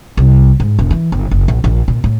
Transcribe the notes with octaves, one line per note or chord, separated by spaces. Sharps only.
C2
G#2
E1
E3
G1
F#1
A#1
A#1
A#2
A2